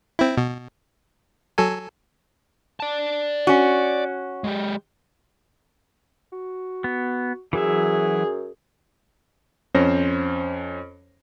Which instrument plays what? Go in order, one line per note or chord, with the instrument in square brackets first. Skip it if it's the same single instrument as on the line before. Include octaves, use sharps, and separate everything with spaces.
[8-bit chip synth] C4 E4
B2
F#3 A4 G#5
[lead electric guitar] D5 A5
[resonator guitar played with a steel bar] C#4 F#4
[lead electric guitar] G#3 G4
[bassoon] F#4
[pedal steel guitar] B3
[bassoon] F#2 [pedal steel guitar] E3 F#3 E5 [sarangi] G#4
[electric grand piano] F2 C#4 C5 C#5 A#6